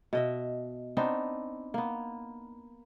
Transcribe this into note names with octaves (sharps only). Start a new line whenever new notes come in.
B2 D#5 E5
B3 C4 D4 D#4
A#3 B3